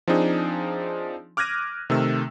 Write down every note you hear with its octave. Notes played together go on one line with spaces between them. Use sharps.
F3 C4 D4 D#4 G#4
D6 F6 F#6 G#6 A#6 D#7
C3 D#3 A3 E6